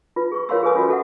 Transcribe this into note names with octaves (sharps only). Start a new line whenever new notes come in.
F4 B4
G#4 C#6
F4 A#4 C#5 F5 C6 E6
G#4 A4 B4 G#5 D#6
C#4 F4 F#4 D#5 B5
F#4 A4 E5 F#5